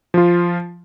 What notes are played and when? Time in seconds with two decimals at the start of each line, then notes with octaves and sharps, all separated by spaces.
0.14 F3 F4